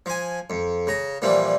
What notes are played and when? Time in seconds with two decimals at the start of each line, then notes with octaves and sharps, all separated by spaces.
0.06 F3 G#5
0.50 F2
0.87 C#3 A#5
1.22 A#2 E3 F3 G3